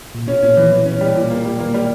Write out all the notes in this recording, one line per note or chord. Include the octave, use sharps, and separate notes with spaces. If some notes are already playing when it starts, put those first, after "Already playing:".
A#2
B2 C#4
A#2 C#4
B2 E3
B2 E3
C#4
G3
A#2
A#3
G3
D#3 A#3
G3